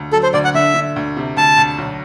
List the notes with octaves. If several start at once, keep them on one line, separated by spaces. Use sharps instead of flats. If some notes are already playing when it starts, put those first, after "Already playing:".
Already playing: D2
F#3 A4
C5
D2 D5
F#5
D3 E5
D3
D2
C3
D2 A5
D2
B1